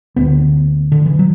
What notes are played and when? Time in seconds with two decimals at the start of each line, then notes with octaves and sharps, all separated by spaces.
0.16 D2 D3 B3
0.92 D3
1.06 E3
1.19 F#3